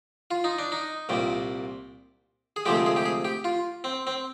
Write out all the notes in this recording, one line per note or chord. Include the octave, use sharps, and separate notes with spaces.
F4
D#4
D4
D#4
C2 A#2 G3
G#4
D2 C3 F3 G#3 G4
G#4
G4
G#4
G4
F4
C4
C4